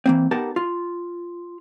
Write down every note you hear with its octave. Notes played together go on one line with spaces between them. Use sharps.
E3 A#3 C4
B3 D#4 G4 A#4 F#5 A5
F4